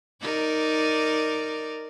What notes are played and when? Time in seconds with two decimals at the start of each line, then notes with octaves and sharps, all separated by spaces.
0.21 D#4 A#4 D5